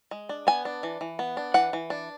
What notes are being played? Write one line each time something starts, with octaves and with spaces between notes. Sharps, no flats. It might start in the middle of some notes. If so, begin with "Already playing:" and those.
G#3
D4
B3 G#5
D4
E3
E3
B3
D4
E3 F#5
E3
D4